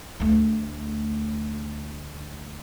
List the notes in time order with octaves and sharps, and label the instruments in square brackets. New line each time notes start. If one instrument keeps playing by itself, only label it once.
[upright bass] D2 A3